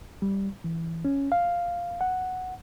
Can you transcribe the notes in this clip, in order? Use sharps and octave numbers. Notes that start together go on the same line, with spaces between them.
G3
E3
C#4
F5
F#5